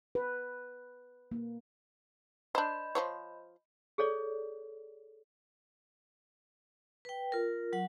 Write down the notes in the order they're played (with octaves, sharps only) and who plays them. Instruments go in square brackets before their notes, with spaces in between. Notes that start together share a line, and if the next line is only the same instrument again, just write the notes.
[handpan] B4
A#3
[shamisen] D4 C5 [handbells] D#5 B5 G6
[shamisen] F3 C5 C#5
[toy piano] G#4 A4 C#5 D5
[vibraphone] B4 G5
F4 A#4
F#3 F#5